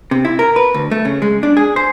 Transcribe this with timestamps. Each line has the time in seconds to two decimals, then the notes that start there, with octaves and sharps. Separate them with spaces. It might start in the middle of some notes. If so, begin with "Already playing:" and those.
0.11 C3
0.25 E4
0.39 A#4
0.56 B4
0.74 D2
0.91 A3
1.05 C#3
1.22 G#3
1.43 D4
1.57 G#4
1.76 C5